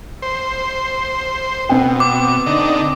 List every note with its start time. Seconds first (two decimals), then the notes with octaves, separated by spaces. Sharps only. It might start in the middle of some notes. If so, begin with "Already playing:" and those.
0.22 C5
1.69 B2 C4 G5
2.00 D6
2.46 D3 D#4